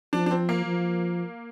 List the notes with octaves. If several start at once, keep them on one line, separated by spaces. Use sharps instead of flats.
F3 D4
D4
C4
A#3
F3